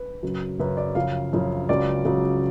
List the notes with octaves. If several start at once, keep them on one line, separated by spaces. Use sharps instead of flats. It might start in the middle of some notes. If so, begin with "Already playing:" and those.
Already playing: B4
F#2 C#3 F#3
F#2 C#3 F#3 B4
D5
F#2 C#3 F3 F5
F#2 C#3 F3
C#2 C#3 F#3 D5
C#2 C#3 F#3